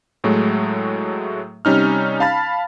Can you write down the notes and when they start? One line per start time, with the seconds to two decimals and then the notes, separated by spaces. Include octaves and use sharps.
0.24 A2 F#3 G#3 A3
1.65 C3 G3 C#4 D#4 F6
2.20 F5 A5 B5 A6